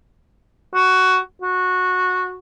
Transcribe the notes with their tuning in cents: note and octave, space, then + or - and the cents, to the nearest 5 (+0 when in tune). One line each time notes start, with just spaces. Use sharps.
F#4 +10
F#4 -15